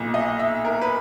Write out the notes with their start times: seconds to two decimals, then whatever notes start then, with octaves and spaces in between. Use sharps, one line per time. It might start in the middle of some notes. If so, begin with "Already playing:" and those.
Already playing: B1 A#2
0.14 D#5
0.39 E5
0.65 A#4
0.81 B4